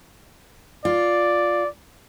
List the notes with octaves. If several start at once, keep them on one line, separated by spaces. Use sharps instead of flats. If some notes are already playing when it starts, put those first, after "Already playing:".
F4 D5